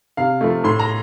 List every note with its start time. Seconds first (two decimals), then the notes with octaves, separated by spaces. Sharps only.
0.17 C3 F5
0.41 F3 A3
0.64 A2 C6
0.79 A#5